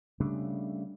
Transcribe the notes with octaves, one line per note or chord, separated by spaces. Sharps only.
C#3 G3 A3 D4